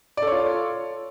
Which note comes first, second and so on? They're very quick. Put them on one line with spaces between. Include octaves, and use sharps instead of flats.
D5 A4 C#5 F4